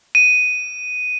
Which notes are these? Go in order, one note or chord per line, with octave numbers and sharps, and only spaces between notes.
D#7